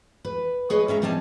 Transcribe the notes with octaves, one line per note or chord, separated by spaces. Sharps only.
B4
G#4 B4 C#5 D#5
G#3 C#4 E5 A#5
A#2 G3 C4 D#4 G#5 A5